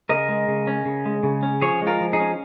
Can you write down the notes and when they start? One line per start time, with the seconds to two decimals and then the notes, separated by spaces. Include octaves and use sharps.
0.09 C#3 A#4 D#5
0.29 G#3
0.48 C#3
0.67 C#4
0.85 C#3
1.06 G#3
1.23 C#3
1.43 C#4
1.61 F3 G#4 C#5
1.81 G#3
1.87 F4 A#4
2.01 F3
2.13 D#4 G#4
2.20 C#4